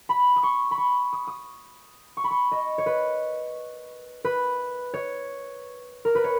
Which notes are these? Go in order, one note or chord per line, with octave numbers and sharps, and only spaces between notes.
B5
D#6
C#6
B5
C#6
D#6
D#6
C#6
B5
C#6
D#5
C#5
B4
B4
C#5
A#4
B4
C#5